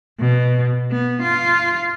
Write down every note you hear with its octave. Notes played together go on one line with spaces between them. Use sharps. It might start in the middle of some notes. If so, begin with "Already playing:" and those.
B2
B3
F4